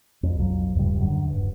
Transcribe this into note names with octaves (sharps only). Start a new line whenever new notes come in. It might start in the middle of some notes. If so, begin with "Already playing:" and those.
F2
B1 F2 F#3
D#1 G2 C#3 G3
F#2 D3
D#1 G2